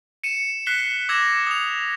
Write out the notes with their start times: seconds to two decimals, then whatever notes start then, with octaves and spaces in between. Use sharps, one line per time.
0.24 C#7 D#7 E7
0.66 F#6 B6 C7 E7 G7
1.09 D6 E6 G#6 A#6 E7
1.47 D#6 F7